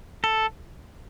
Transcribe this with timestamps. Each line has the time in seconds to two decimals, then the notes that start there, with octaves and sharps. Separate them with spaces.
0.24 A4